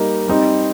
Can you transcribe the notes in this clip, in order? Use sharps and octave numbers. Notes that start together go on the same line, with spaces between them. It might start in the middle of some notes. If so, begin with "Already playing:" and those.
Already playing: G3 A#3 D#4
G3 C4 D#4